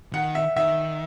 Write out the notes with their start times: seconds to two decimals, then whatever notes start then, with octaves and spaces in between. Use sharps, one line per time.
0.13 D#3 F#5
0.35 E5
0.57 D#3 E5